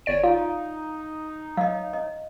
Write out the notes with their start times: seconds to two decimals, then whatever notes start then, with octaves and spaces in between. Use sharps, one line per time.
0.06 G1 C#5 D5 D7
0.24 D#4 F4 F5
1.57 F#3 D#5 F5
1.93 D#5